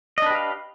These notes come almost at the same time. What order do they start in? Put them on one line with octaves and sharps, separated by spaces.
D#5 D4 B4 G4 F5